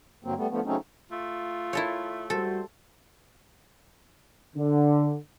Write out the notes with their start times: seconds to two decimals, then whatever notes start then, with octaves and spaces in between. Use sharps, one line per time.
0.24 G2 D3 F#3 A#3 C4
0.37 G3 A3 B3
0.50 D3 F3 A3 B3
0.65 C#3 F#3 A3 C4 C#4 D#4
1.12 A3 F4
1.73 E4 A4 C#5
2.30 G3 F#4 A4 C5
4.56 D3